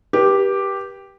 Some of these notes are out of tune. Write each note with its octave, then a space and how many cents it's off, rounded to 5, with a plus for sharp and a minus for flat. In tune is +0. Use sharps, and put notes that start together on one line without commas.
G4 +0 B4 -40